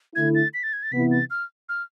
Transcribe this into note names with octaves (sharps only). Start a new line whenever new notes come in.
D3 A3 E4 G#6
A6
B6
A6
G#6
A6
C3 E3 B3 E4 B6
A6
F6
F6